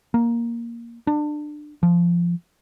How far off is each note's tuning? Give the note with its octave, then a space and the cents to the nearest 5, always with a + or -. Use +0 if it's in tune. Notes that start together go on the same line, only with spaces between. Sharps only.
A#3 +5
D4 +25
F3 -15